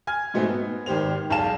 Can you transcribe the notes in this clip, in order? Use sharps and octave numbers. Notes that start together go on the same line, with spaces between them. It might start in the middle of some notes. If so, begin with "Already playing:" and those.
G#5 F6 G#6
G#2 B2 A3 C4 D#4
B3
G#1 D#3 G4 C5 F7
E1 B1 F5 A5 E7